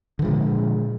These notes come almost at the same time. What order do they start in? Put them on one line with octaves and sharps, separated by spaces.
D3 F3 G#3 A#2